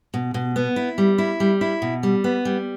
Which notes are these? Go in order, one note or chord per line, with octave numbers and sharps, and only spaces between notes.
B2
B2
B3
E4
G3
E4
G3
E4
B2
G3
B3
G3